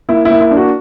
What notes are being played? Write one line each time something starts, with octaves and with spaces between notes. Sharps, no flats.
A#3 E4
E4
A#3
E4
D4
F#4